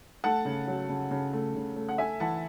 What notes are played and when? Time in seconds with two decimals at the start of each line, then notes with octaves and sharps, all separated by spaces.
0.24 A3 F#5 A5
0.45 C#3
0.67 F#3
0.89 C#3
1.11 C#3
1.33 A3
1.55 C#3
1.76 A3
1.89 F#5
1.98 A3 E5 G#5
2.20 E3 F#5 A5